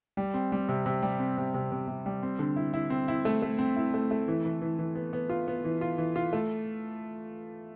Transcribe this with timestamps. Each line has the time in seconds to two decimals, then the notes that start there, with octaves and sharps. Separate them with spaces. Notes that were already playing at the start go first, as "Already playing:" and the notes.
0.17 G3
0.34 C4
0.52 G3
0.69 C3
0.86 C3
1.02 G3
1.19 C4
1.38 C3
1.54 C3
1.72 C3
1.88 C3
2.06 G3
2.23 C4
2.39 D3
2.56 E4
2.74 E4
2.90 C4
3.08 E4
3.25 A3
3.42 A3
3.58 C4
3.76 E4
3.94 A3
4.11 A3
4.28 E3
4.45 E3
4.62 E3
4.79 E3
4.95 B3
5.13 B3
5.30 F4
5.48 B3
5.64 E3
5.81 F4
5.98 E3
6.16 F4
6.33 A3